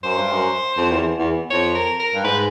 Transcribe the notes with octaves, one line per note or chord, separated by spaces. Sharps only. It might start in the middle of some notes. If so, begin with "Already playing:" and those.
F#2 C5
G2
F#2
F2
E2
E2
F2 C#5
A#4
A#4
G2
G#2 B4